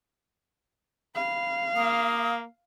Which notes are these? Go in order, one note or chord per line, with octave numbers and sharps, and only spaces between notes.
F5 B5
A#3 D#6